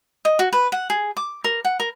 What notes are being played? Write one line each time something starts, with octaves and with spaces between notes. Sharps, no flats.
D#5
F#4
B4
F#5
G#4
D6
A#4
F#5
A#4